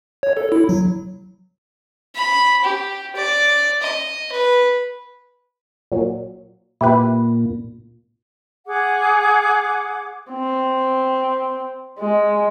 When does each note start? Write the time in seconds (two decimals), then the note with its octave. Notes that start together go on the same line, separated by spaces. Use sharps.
0.23 C#5
0.37 A4
0.52 E4
0.69 F#3
2.15 B5
2.64 G4
3.16 D5
3.82 D#5
4.32 B4
5.92 A#2 F#3
6.81 A#2 E4 G4 B4
8.67 G#4 F#5 D6
10.31 C4
11.99 G#3